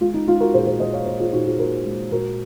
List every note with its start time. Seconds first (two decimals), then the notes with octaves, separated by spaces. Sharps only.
0.01 G#3 F4
0.14 D#4
0.27 G#3 F4
0.40 F#4 A#4
0.53 A#2 G#4 C5
0.67 G#4 C5
0.80 G#3 C5 D#5
0.93 C#5 F5
1.06 A#2 C5 D#5
1.19 F4 G#4
1.33 A#2 D#4 F#4
1.46 F4 G#4
1.59 A#2 F#4 A#4
1.85 G#3
2.12 A#2 F#4 A#4